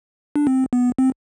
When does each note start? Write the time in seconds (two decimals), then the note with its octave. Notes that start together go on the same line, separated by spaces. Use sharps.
0.36 D4
0.47 C4
0.73 B3
0.98 C4